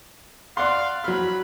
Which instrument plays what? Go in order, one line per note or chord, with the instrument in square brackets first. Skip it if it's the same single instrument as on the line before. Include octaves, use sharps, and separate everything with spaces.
[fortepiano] D5 F#5 C6 [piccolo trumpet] F5
[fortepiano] F#3 F6 [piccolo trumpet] B5